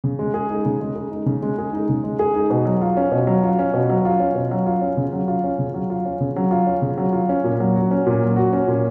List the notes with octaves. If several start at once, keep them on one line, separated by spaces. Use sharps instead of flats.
C#3
G#3
G#4
D#4
C#3
G#3
G#4
D#4
C#3
G#3
G#4
D#4
C#3
G#3
G#4
D#4
B2
F#3
F4
C#4
B2
F#3
F4
C#4
B2
F#3
F4
C#4
B2
F#3
F4
C#4
C#3
F#3
F4
C#4
C#3
F#3
F4
C#4
C#3
F#3
F4
C#4
C#3
F#3
F4
C#4
A#2
F#3
F#4
C#4
A#2
F#3
F#4
C#4
A#2